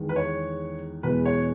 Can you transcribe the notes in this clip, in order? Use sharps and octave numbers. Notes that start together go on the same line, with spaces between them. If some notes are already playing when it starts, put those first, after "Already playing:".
Already playing: E2 D#3 G#3 B3
B4
C#5
E2 B2 G#3 B3 B4
C#5